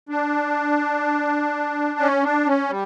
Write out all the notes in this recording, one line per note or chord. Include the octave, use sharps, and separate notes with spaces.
D4
C#4
D4
C#4
G3